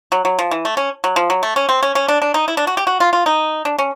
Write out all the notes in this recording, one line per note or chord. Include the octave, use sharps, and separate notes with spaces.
F#3
F#3
F3
E3
A3
C#4
F#3
F3
F#3
A3
C#4
C4
C#4
C#4
D4
D4
D#4
E4
D4
F#4
G4
F#4
F4
F4
D#4
D4
C#4